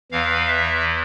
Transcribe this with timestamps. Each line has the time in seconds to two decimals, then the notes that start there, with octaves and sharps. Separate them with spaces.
0.12 E2 E3 F5
0.47 E5